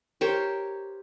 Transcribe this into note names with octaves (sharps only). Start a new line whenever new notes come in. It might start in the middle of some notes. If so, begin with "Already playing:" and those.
G4 A#4 C5 C#5